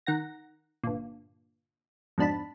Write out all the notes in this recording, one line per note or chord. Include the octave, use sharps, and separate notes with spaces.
D#3 F#5 A#6
G1 A#2
F2 G#2 B2 D4 A5 B5